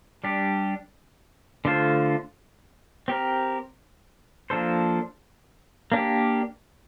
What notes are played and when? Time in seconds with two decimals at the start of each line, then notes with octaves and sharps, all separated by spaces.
0.24 G3 D4 G4
1.65 D3 A3 D4 F4 C5
3.08 C4 G4 A#4
4.50 F3 A#3 D4 A4 C5
5.92 A#3 D4 G4